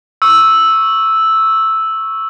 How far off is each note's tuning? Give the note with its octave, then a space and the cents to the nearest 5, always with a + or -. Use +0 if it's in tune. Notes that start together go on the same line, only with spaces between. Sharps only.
C#6 +0 E6 -5